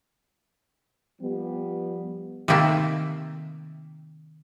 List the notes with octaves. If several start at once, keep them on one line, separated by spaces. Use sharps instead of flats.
F3 G3 B3
C3 D#3 A3 A#3 C4 E5